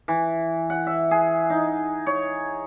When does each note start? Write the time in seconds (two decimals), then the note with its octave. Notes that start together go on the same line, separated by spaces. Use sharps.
0.08 E3
0.70 F#5
0.87 E5
1.11 G#4
1.50 D#4
2.06 C#5